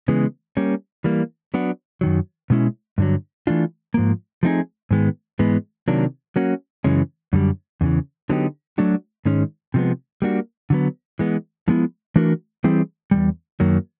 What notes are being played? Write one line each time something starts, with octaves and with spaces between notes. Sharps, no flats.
C#3 E3 G#3 B3
G3 A#3 C#4
E3 G3 A#3
F#3 B3 D4 F#4
F#2 D#3 F#3
B2 G#3 C#4 E4
G2 D3 F#3
E3 A3 D4 F4
G#2 F3 A#3
F3 A3 C4 D#4 G#4
G#2 D#3 G#3 B3
G#2 E3 G#3 B3
C3 D#3 F#3 A#3 D4
F#3 A#3 C#4 F#4
F#2 C#3 E3 G#3 C#4
F#2 D3 G3
E2 C#3 E3
D3 F#3 B3 D#4 G4
F#3 A3 D4 F#4
G#2 D#3 G#3 C#4
C3 F3 G#3 B3
G3 A#3 D4 F#4
D3 F#3 B3
E3 G#3 B3
D3 F3 G#3 B3 E4
E3 A3 D4 F#4 A#4
E3 G3 C4 E4 G#4
E2 B2 G3
F#2 D#3 F#3 A#3